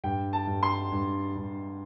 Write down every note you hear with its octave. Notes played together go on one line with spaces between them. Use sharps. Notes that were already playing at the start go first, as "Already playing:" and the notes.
G2 G5
A5
G2
C6
G2
G2